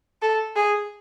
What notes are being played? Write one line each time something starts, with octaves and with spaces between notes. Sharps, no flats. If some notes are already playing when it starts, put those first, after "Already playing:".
A4
G#4